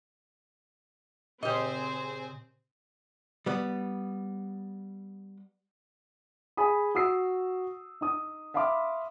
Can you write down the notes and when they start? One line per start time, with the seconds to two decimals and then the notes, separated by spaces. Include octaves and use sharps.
1.43 A#2 C#3 C4 G4 G#4 C5 D#5
3.46 G3 B3
6.57 G#4 G#5 B5 D#6
6.95 F#4 D#6 E6 C7
8.01 D#4 D#6
8.54 E5 F5 B5 C6 D6 F6